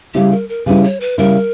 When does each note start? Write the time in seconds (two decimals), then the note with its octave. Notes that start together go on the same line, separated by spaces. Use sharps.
0.14 C#3 G3 C#4 E4 G4
0.31 A#4
0.49 A#4
0.66 C#3 G3 C#4 E4 B4
0.83 C#5
1.00 B4
1.18 C#3 G3 C#4 E4 A#4